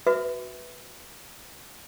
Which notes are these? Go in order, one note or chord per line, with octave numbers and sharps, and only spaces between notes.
F#4 B4 E5